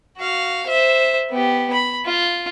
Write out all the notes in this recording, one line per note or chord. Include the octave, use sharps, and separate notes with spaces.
F#4 F5
C5 E5
B3 G4
B5
F4